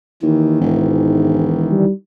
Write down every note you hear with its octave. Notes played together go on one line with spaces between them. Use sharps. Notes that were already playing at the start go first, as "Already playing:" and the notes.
D#2 D#3 E3
E1 G#2
G3